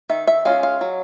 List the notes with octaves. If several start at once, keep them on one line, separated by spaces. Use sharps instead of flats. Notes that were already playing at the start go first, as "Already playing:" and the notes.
D#3 E5
E5
G#3 C#4 F4 F5
F5
F#3